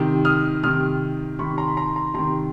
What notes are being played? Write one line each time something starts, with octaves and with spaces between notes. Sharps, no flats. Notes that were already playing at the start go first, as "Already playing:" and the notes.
Already playing: C3 D#3
D#6 F6
C3 D#3 D#6 F6
C3 D#3 B5 C#6
A#5 C6
B5
A#5 C6
A#5 C6
C3 D#3 A#5 C6